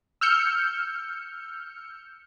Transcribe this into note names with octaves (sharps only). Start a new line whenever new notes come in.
E6 F6 G6 C#7